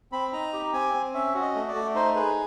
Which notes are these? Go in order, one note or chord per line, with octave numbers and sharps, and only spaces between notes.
C4 B5
D#4 A#5
G4
C4 G#5
C4
C#4 E5
F#4
D#5
A3
D5
A3
D#4 C5
G#4 B4